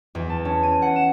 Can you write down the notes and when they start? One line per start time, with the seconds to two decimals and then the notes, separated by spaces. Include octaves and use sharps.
0.15 E2
0.29 A5
0.45 C#4
0.63 D#7
0.82 F#5
0.96 E7